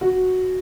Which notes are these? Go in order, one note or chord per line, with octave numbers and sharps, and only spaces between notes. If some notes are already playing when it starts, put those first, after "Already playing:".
F#4